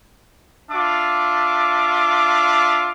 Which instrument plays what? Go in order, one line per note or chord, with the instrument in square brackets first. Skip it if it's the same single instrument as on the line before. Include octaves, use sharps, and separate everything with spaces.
[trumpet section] D4 F4 E5 D6